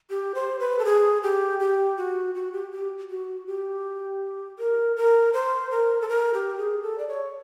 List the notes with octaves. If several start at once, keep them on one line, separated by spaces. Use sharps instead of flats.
G4
C5
B4
A4
G#4
G4
G4
F#4
F#4
G4
G4
F#4
G4
A#4
A#4
C5
A#4
A4
A#4
G4
G#4
A4
D5
C#5